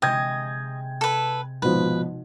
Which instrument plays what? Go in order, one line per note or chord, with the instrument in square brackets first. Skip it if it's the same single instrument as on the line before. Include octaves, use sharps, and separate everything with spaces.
[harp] C3 G#3 [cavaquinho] D#5 [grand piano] G5 G6 G#6
[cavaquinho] A4 B4
[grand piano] G#1 B2 F3 [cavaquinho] B4